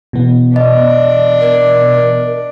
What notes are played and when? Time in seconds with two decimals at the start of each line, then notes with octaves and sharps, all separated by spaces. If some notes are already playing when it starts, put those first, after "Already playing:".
0.13 B2 E3 B3
0.56 D4 D#5
1.40 A#4